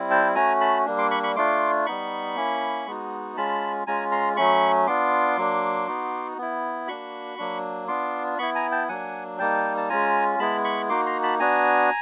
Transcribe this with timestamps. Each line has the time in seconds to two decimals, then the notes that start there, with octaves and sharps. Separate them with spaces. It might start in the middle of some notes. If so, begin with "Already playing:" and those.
Already playing: G3 C4 E4
0.11 G5 A5
0.35 A3 C#4 F#4 G#5 A#5
0.61 A5 B5
0.86 G3 A#3 D4
0.98 C6 D6
1.11 B5 C#6
1.23 B5 C#6
1.36 A3 D4 F4 C6 D6
1.86 G3 B3 D#4 B5 C#6
2.36 A#3 C#4 E4
2.86 G#3 B3 D#4 F#4
3.37 G#3 C#4 F4 A5 B5
3.87 G#3 C#4 F4 G#5 A#5
4.11 A#5 C6
4.37 F#3 A3 C#4 B5 C#6
4.87 B3 D4 F4 C6 D6
5.37 F#3 A#3 D4
5.87 B3 D#4 F#4
6.38 B3 E4
6.88 A#3 D4 F#4 B5 C#6
7.38 F#3 A#3 D4
7.88 B3 D4 F4 C6 D6
8.38 B3 E4 B5 C#6
8.55 G#5 A#5
8.71 G5 A5
8.89 F#3 A#3 D4 F#5 G#5
9.39 G3 A#3 D#4 G5 A5
9.77 A5
9.89 G#3 C#4 F4 G#5 A#5
10.39 G#3 B3 E4 A5 B5
10.64 B5 C#6
10.89 A#3 D#4 F#4 C6 D6
11.06 A#5 C6
11.23 A5 B5
11.39 B3 D4 F#4 G#5 A#5